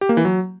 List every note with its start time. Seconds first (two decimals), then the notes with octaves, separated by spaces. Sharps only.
0.01 G4
0.09 A#3
0.17 E3
0.25 F#3